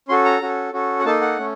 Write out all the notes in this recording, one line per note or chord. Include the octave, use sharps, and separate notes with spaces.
C#4 F#4 A4 C6
A#5
C#4 F#4 A4
C#4 F#4 A4
F#5
A#3 D#4 A4 A5
F#5
A3 C#4